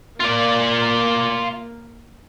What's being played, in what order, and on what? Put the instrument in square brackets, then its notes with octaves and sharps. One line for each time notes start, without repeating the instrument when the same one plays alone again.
[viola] A#3 [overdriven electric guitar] F4 D5